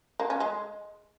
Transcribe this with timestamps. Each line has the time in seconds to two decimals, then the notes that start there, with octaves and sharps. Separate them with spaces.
0.20 A#3
0.30 C#4
0.40 G#3